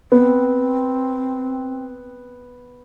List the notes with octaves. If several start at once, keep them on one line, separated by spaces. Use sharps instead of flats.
B3 C4